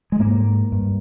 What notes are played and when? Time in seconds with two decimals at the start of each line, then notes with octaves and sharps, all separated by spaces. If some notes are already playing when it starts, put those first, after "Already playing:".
0.12 G#3
0.19 G#2 A#3
0.72 G2